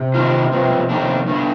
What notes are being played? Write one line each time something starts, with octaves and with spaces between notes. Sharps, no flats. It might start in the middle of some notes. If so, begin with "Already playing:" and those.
Already playing: C3
D#3 G3 D4 F4
G2 F3 C4
F2 D#3 A3 D4
G2 D3 A3